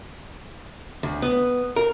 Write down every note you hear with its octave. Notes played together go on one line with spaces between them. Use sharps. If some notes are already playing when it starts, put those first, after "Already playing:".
D2
B3
A#4